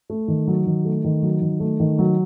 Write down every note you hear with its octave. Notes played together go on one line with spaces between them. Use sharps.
A3
D#3
F#3
D#3
A3
D#3
F#3
D#3
A3
D#3
F#3